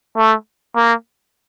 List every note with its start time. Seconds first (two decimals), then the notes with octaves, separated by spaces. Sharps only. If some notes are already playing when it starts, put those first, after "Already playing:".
0.17 A3
0.76 A#3